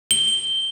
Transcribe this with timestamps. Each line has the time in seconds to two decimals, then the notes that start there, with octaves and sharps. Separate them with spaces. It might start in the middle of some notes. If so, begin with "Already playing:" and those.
0.11 G7